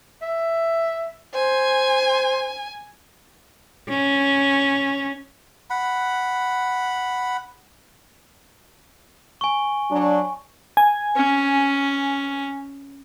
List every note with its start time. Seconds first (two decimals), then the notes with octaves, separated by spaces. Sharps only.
0.22 E5
1.34 C5 G#5
3.89 C#4
5.70 F#5 B5
9.41 G#5 C#6
9.91 F#3 D4
10.77 G#5
11.16 C#4